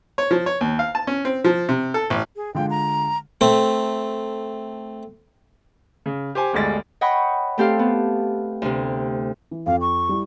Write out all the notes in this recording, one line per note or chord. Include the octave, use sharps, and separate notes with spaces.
C#5
F3
C#5
D#2
F5
A5
C#4
C4
F3
C3
A4
A1
G#4
D3 G#3 F4 G5
A#5
A3 C4
C#3
G4 C5 G#5
G1 D2 G3 G#3 A6
C#5 D#5 F#5 G5 B5 C#6
A3 C4 G4 A4 C5 F5
B3
D2 C3
E3
F2 F5
C#6
G3 E4